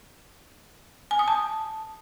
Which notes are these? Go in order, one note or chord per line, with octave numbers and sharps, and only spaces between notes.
G#5
D#6
A5